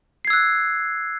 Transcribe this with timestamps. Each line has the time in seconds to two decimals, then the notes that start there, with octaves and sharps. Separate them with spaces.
0.25 C7
0.27 G#6
0.30 E6
0.33 F#6